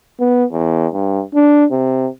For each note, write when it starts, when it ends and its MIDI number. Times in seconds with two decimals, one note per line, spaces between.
0.20 0.45 59
0.52 0.87 40
0.94 1.22 43
1.35 1.66 62
1.71 2.07 48